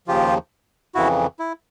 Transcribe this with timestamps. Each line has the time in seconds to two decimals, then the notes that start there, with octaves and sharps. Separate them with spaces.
0.07 D#2 C#3 F3 F4 G4
0.95 F2 C#3 E3 E4 F#4
1.39 E4